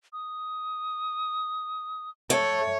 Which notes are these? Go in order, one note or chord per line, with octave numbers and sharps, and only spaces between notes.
D#6
A3 C#5